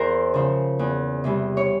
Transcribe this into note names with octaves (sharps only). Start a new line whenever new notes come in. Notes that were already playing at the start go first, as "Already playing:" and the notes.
Already playing: E2 A#4 C5
C#3 F3
E2
C3 E3 G3
C#5